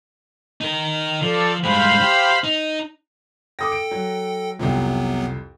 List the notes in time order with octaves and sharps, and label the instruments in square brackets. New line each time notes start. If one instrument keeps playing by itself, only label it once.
[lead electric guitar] D#4 A#4
[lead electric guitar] F3 [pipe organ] A4 D5
[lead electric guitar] G2 G#3 [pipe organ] C5 F5 B5
[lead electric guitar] G4
D#4
[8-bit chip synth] A4 G5 [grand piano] D6 D#6 A#6
[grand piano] D7
F#3
[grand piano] C2 F2 [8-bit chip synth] C3 F#3 B3